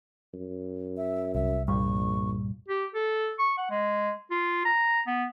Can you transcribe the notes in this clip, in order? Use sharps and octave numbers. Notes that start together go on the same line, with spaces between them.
F#2
E5
C2 E5
A#1 G2 A#2 G3 C#6
G4
A4
C#6
F#5
G#3
F4
A#5
B3